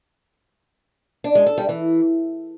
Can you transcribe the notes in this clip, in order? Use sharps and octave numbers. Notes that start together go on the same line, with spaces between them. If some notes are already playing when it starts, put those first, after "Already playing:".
D4
G#3
A4
G3
E3